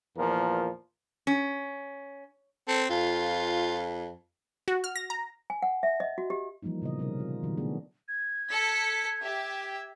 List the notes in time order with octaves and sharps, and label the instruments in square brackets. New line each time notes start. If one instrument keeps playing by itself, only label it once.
[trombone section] E2 A#2 F3 A#4
[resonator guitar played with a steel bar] C#4
[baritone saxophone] C4 [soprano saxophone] A4
[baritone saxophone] F2 [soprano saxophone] F4
[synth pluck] F#4
F6
A#6
A#5
[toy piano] G#5
F#5
E5
D#5
F#4
G4
[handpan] E3 F3 G3 A#3 D#4
A#2 C#3 B3 D#5
C3 G3 C#4 D#4 A#4
F4
B2 D#3 F#3
A3 B3 D4 F#4 G#4
[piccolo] G#6
[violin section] A4 B6 C#7
G4 E5